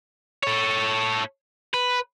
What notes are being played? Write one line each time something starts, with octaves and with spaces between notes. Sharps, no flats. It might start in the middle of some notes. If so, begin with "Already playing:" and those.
A4 C#5
B4